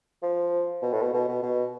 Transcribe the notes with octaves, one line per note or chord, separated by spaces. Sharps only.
F3
B2
A2
B2
B2
B2
B2